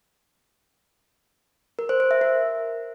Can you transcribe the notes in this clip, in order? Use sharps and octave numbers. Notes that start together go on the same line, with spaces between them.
A#4
C5
C5
E5
A#4